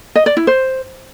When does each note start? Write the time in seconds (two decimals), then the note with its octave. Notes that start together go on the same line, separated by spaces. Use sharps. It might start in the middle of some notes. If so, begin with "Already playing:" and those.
0.15 D#5
0.26 D5
0.37 E4
0.47 C5